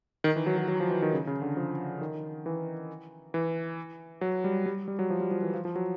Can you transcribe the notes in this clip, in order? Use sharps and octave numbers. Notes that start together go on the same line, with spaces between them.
D#3
E3
F#3
F#3
F#3
F3
E3
D#3
C#3
C#3
D3
F3
D#3
E3
E3
F#3
G3
G3
G3
F#3
F3
G3
F3
E3
F3
F3
F#3